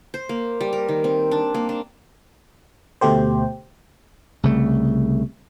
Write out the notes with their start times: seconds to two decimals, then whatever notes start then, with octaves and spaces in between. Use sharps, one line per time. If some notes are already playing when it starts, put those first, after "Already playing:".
0.14 C5
0.29 A#3
0.61 G3
0.73 A#4
0.88 D#3
1.04 C4
1.31 D4
1.54 A#3
1.69 D4
3.01 D2 B2 A3 G4 C5
4.43 C2 C#3 A3